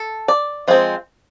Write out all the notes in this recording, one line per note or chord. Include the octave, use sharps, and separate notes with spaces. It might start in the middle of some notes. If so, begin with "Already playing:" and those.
Already playing: A4
D5
F3 G#3 C4